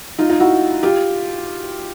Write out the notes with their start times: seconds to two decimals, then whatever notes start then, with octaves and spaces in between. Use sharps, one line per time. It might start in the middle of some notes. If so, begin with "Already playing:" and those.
0.18 D#4 F4
0.29 D#4 F4
0.40 E4 F#4
0.83 F4 G4